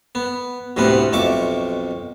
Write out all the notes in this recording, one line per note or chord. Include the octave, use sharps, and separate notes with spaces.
B3
D2 A2 C3 B3 B4
B1 F2 E5 C#6 D6